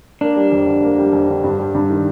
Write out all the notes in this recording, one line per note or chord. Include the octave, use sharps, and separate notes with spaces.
A#3 D4
G3
F2
D3
A#3
G3
F2
D3
G2
G3
G2
D#3